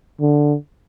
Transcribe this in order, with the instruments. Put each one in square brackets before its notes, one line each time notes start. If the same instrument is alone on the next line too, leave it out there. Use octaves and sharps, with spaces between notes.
[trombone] D3